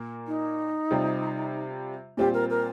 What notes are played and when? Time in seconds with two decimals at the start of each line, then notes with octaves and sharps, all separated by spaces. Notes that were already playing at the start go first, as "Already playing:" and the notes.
Already playing: A#2 A#3
0.27 D#4
0.91 C3 G3 C4 F4
2.17 A#2 G3 C4 F4 G4
2.34 A#4
2.50 A#4